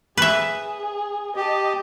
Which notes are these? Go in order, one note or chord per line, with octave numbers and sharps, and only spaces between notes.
G#4 B4 E5
G4 D#5 A5